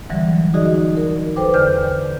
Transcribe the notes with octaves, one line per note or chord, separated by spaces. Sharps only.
D3 E3 F#3 G3
D#4 F#4 G#4 D5 D#5
D#4
A#4
A4 B4 C5 G5 D6
E2 D3 C5 D5 F6 G6